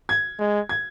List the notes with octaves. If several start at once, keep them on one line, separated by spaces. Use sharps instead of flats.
G#6
G#3
G#6